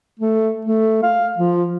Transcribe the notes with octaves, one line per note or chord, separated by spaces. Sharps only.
A3
A3
F5
F3